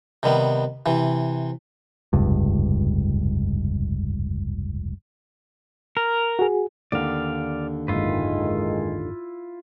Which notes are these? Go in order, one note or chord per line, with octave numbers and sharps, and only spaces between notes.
C3 D#3 G3 B3
C3 E3
F1 C#2 G2
A#4
F#4 G#4
D#2 D3 D5 F5
F#1 G#2 D#3 G#3 E4 F4 B4